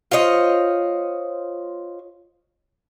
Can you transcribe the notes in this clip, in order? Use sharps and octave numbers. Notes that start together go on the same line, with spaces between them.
F4 C5 C#5 D#5